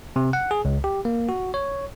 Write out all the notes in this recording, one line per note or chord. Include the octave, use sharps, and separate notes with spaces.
C3
F#5
G#4
C#2
G4
A#3
F#4
C#5